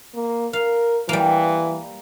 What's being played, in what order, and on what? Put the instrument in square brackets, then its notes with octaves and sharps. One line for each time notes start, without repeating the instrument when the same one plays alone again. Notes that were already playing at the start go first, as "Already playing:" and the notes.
[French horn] A#3
[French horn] A#4 [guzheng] F5
[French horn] E3 [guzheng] G3 A#3